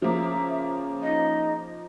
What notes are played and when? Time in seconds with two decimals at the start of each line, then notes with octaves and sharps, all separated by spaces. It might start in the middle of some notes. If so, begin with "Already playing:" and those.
0.02 C#3 F3 A#3 E5
1.02 D#4 D#5